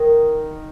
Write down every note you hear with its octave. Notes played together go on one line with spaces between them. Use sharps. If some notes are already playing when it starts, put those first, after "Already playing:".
Already playing: D#3 D#4